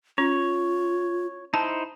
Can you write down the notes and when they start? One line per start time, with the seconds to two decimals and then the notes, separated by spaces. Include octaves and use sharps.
0.18 C#4 F4 C#5
1.54 D#4 E4 C5 A5